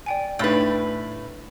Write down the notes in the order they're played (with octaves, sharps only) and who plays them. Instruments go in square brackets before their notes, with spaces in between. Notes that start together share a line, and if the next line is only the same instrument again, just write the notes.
[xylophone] D5 G5 G#5
[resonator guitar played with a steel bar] A2 B4 [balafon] A3 D4 D#4 [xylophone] E6 A6